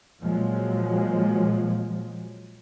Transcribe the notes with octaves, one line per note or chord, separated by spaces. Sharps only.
A#2 F3 F#3 G#3